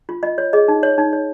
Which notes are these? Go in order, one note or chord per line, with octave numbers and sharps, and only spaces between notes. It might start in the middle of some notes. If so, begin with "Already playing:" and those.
F4
F4 D#5
C#5
G#4 D#5
D#4
C#5
D#4
C#5